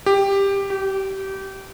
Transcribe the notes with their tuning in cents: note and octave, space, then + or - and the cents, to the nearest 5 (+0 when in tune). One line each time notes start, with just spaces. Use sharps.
G4 +10
G4 -25